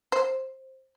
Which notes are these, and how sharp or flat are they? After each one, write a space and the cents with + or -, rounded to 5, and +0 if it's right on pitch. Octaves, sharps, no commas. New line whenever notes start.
C5 +10